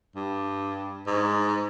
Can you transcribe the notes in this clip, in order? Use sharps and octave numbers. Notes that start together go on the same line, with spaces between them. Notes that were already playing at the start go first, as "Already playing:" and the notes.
G2
G#2